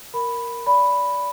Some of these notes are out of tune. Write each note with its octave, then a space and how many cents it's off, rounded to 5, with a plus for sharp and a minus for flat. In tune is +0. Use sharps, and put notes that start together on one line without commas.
A#4 +0 B5 +0
D5 -25 B5 +0